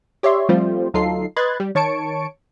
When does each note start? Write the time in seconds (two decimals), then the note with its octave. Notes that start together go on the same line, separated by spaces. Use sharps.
0.23 G4 C#5 D5 E5 C6
0.49 F3 G3 A3 C4 F4 C5
0.94 D2 F#3 D#4 F4 A4 C7
1.36 B4 D#5 C6 F#6 G#6 A6
1.60 G3
1.75 D#3 C#5 A5 C#6 C#7 D7